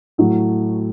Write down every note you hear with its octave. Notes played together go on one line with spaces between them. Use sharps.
A2 F#3 A3